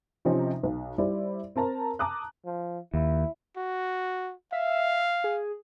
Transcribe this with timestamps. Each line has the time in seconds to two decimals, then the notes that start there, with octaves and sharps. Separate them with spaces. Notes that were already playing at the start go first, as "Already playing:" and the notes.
0.25 C3 F3 C4 C#4 D#4
0.63 B1
0.98 G3 E4 G4 C5 D5
1.56 C4 A#4 A5 A#5
1.99 A5 A#5 D6 D#6 F#6
2.45 F3
2.94 D#2 E4
3.56 F#4
4.53 E5 F5
5.24 G#4